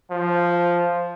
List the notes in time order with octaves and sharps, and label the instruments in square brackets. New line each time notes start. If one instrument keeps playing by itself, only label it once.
[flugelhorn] F3